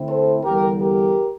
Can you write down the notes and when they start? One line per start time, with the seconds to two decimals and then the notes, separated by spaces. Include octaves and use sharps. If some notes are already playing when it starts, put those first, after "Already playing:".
Already playing: D3 A3 C4 E4
0.09 A4 C5
0.44 E2 D3 G3 G4 A#4
0.80 G4 A#4